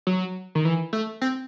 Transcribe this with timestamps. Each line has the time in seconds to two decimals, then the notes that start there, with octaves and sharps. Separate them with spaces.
0.07 F#3
0.55 D#3
0.65 E3
0.93 A3
1.22 C4